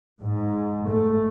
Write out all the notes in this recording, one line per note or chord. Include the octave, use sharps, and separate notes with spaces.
G#2
A3